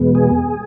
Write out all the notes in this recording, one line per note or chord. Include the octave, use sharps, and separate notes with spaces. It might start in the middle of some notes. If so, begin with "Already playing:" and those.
Already playing: E2 B2 G#3 B3
G#4